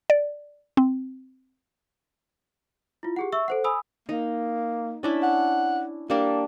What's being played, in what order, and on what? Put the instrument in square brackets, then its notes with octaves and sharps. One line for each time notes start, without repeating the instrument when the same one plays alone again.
[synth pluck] D5
C4
[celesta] E4 F4
G4 G#4 F#5
E5 C#6 E6
A4 C5 F#5
G#5 B5 D#6 E6
[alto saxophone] A#3 [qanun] D#4
[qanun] C#4 D4 E4
[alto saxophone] F#5
[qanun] G3 D4 [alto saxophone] A#3